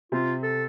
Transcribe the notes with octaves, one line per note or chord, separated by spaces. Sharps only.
C3 C4 F4
A4